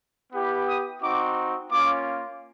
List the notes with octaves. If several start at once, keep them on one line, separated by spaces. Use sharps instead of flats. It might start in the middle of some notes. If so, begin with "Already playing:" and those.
B3 E4 G4
D#6
C4 D#4 F#4 D6
A#3 C#4 F4 D6